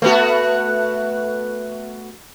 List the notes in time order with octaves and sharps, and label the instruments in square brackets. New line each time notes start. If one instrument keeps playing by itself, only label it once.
[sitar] A3 B3 F#4